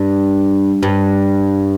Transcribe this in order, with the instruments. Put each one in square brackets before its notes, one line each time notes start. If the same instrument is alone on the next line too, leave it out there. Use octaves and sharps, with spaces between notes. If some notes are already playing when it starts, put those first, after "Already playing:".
Already playing: [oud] G2
G2